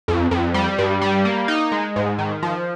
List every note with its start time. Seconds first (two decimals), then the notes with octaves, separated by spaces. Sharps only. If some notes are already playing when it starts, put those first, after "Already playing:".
0.08 F2
0.31 F2
0.54 G3
0.78 G2
1.02 G3
1.25 A#3
1.48 D#4
1.72 G#3
1.96 G#2
2.18 D#3
2.43 F3